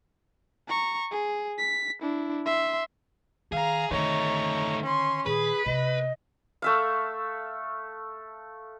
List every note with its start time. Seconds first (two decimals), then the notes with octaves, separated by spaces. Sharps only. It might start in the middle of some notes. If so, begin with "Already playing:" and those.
0.68 A#5 C#6
1.11 G#4
1.58 B6
2.02 D4 E4
2.46 E5 C6
3.52 D#3 G#4 F5 A#5
3.91 D3 D#3 A3 D#4 C#5 A#5
4.82 C#4 C6
5.26 A#2 D#3 G#4 B4 B5
5.66 C3 B3 D#5
6.62 A3 E5 F5